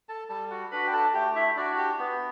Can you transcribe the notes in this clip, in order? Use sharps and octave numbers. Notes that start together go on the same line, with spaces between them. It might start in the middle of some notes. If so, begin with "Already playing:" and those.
A4 A5
G3 A4 A5
F#4 F#5
D4 F#4 B4 B5
G5
A4 A5
A3 G4 G5
E4 E5
D4 F#4 D5
G4
B3